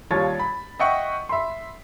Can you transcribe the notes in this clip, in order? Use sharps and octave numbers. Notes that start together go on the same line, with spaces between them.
D#2 G3 F4 C#5 A5 A6
B5
D#5 E5 F#5 G5 C#6
E5 B5 C6